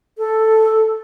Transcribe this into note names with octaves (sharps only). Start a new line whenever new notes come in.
A4